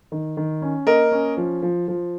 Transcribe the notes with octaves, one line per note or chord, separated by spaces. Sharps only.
D#3
D#3
C#4
A#3 A#4 D#5
C#4
F3
F3
F3